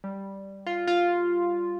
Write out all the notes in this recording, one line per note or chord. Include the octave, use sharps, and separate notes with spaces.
G3
F4
F4